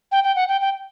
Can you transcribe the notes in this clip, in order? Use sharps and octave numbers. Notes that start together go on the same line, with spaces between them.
G5
G5
F#5
G5
G5